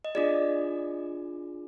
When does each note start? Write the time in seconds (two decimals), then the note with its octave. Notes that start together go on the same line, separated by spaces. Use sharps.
0.05 D#5
0.15 D4 F4 G#4 D5